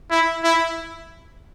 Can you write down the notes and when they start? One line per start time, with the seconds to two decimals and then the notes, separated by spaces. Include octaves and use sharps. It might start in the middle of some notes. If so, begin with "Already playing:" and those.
0.11 E4
0.44 E4